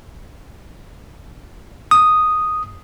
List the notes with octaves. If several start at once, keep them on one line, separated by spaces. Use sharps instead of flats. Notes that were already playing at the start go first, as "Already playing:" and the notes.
D#6